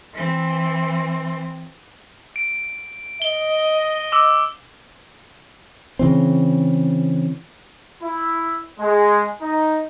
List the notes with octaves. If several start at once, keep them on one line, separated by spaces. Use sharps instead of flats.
E3 C4
D7
D#5 G7
D6 E6
C#3 E3 C4
E4
G#3
D#4